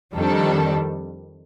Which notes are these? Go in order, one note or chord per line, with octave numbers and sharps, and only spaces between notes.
F2 D#3 G3 D4 A4